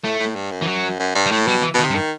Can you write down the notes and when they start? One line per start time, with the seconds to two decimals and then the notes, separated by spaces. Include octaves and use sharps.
0.04 A2 A3
0.20 A2
0.36 G2
0.52 F#2
0.62 E3
0.67 F#3
0.99 F#2
1.15 G2
1.26 G3
1.31 A2 A3
1.47 B2 G3
1.63 E3
1.74 B2
1.79 D#3
1.84 C3
1.90 G2
1.95 D#3